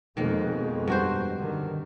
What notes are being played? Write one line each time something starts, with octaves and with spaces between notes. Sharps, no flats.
F2 B2 D#3 G#3 A#3
G2 F#4 C5
D3 D#3